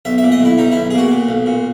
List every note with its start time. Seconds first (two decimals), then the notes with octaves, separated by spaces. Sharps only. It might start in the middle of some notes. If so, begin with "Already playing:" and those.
0.05 B1 E5
0.18 A#2 E5
0.32 D#5
0.40 B1 E4
0.58 B1 D#4
0.72 B1 E4
0.91 G#4
0.94 A#2 F#4
1.12 A#2
1.29 B1
1.46 A#2